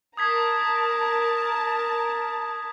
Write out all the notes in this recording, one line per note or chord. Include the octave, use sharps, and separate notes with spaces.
A#4 A5 A#5 D#6 G#6 B6